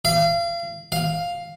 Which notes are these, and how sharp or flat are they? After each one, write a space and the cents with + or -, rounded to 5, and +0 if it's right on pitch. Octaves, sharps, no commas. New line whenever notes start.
F5 -35
F5 +5